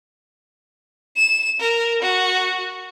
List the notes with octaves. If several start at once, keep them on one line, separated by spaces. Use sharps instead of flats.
E7
A#4
F#4